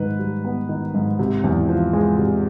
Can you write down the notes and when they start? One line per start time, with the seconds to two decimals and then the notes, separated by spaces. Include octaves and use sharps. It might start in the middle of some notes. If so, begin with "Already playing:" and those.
Already playing: G#2 D#3 B4
0.19 G3
0.45 B3
0.69 D#3
0.94 G#2
1.19 C3
1.44 E2
1.69 F3
1.93 G#3
2.18 C3